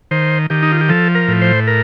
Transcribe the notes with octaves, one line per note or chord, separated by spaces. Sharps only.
D#3 C5
D#3 G4
D#4
F4
G4
F3 A4
A#4
A2
C5
A#4